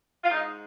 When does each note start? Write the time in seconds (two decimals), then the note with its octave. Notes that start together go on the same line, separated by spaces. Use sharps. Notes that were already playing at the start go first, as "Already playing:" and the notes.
0.23 F4
0.29 G#2 D#4